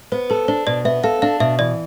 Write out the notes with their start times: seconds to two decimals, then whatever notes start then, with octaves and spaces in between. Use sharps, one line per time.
0.12 B3 C5
0.30 A4 B4
0.48 D4 C5
0.67 B2 D5
0.85 B3 E5
1.04 A4 F5
1.22 D4 F5
1.40 B2 E5
1.59 E3 D5